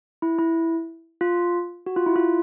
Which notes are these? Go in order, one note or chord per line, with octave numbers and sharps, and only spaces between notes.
E4
E4
F4
F#4
F4
E4
F4